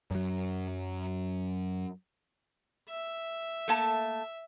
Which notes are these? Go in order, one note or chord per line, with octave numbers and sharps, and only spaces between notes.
F#2 F#3
E5
A3 A#3 A5